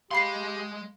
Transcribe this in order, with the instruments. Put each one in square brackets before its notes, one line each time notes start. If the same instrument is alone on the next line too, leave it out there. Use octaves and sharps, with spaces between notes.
[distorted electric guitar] G#3 C6 [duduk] G4 [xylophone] F5 B5 C7